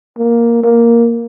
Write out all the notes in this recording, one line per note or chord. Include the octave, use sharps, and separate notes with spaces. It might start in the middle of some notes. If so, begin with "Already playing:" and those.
A#3
A#3